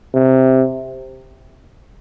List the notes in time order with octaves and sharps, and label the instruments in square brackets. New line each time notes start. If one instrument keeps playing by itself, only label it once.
[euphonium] C3